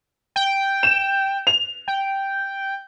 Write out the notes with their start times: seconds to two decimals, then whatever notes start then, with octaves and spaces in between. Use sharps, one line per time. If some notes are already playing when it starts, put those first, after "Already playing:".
0.36 G5
0.83 E7
1.47 F7
1.88 G5